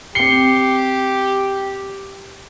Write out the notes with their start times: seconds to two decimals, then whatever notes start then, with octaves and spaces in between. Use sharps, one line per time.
0.15 C4 G4 C7 C#7 G7